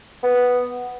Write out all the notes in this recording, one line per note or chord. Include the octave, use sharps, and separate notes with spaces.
B3